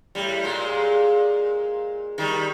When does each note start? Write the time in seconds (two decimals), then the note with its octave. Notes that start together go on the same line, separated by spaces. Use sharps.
0.15 A2 G3
0.43 A#2 G#3
2.18 D#3 G3